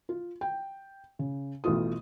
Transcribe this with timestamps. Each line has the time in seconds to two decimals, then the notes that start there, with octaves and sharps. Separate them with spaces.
0.09 F4
0.41 G5
1.19 C#3
1.64 A1 B2 A3 F4 D#6